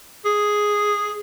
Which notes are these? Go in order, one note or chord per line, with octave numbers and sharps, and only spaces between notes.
G#4